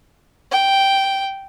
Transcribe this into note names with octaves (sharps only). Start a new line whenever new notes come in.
G5